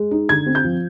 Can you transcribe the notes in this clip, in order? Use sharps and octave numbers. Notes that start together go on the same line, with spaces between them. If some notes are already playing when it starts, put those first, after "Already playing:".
Already playing: G#3
D#4
D3 G#6
C4
G6
F3